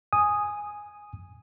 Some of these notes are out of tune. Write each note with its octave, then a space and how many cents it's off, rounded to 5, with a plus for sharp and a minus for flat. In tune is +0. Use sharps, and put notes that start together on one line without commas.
G#5 +0 D#6 +0